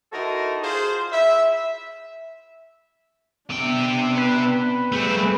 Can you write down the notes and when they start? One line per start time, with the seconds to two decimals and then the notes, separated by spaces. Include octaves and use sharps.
0.13 D#4 E4 F#4 A4 A#4 C5
0.63 F4 G#4 C5
1.13 E5
3.50 C3 B3 D4 G5
4.17 B4
4.92 G3 A3 C4 G#4